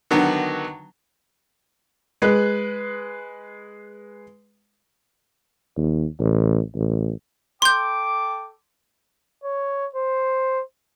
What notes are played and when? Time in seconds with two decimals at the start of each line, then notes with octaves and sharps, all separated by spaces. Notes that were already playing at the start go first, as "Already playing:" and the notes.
0.11 D3 D#3 F#3 B3
2.22 G#3 B4
5.77 D#2
6.19 A1
6.75 A1
7.62 A4 G5 C6 D6 G6
9.44 C#5
9.95 C5